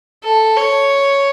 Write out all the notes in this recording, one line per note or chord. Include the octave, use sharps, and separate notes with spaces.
A4
C#5